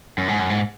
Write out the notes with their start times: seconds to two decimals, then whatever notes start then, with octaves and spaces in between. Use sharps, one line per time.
0.18 F#2
0.28 G#2
0.39 F#2
0.50 G#2